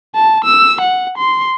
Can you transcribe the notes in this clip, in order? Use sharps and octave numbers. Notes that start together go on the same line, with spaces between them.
A5
E6
F#5
C6